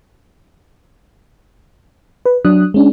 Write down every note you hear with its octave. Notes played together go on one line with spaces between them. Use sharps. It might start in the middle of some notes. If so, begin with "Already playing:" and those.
B4
F#3 D4 D#6 F#6
G#3 C#4 D4